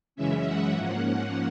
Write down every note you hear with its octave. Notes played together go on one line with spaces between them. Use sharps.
F#2 C#3 E3 G#3 C#4 E5
F#5
G#2 F3 A#3 C#4 F#5